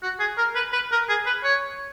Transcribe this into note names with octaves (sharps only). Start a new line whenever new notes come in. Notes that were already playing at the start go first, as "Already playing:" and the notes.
F#4
G#4
A#4
B4
B4
A#4
G#4
B4
C#5